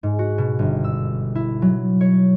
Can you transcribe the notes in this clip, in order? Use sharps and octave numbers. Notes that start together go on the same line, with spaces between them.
G#2
F#4
B2
G1
E6
E4
F#3
C#5